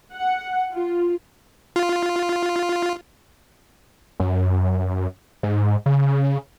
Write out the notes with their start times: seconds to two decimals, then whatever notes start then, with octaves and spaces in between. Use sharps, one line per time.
0.13 F#5
0.72 F4
1.76 F4
4.20 F#2
5.43 G#2
5.86 C#3